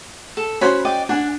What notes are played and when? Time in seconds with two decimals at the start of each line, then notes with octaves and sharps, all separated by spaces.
0.37 A4
0.61 C#4 F#4 C5 B5
0.85 D5 D#5 G5
1.09 D4 F#5 G#5